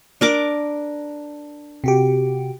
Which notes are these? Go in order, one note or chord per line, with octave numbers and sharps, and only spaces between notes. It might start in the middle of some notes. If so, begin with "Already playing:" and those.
D4 A#4 D6
C3 F#4 G4